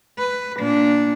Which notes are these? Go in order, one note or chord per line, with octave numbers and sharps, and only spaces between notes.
B4
A#2 D4